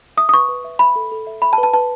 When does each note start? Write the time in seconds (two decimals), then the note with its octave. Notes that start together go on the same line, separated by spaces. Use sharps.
0.17 E5 D#6
0.29 D#6
0.33 B4 C#6
0.49 B4
0.64 E5
0.79 E5 B5
0.96 A4
1.12 A4
1.27 E5
1.42 E5 B5
1.53 A5
1.58 B4
1.63 A5
1.74 B4 A5